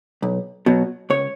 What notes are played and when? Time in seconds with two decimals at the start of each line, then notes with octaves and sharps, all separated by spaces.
0.22 B1
0.66 B2 F#3
1.10 C#2 C#5